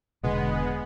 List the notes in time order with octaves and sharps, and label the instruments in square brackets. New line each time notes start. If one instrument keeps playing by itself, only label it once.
[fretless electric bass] E1 B2 D3 [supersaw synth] G#3 B3